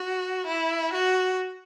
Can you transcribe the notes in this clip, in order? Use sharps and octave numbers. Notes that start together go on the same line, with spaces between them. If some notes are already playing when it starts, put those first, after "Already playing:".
Already playing: F#4
E4
F#4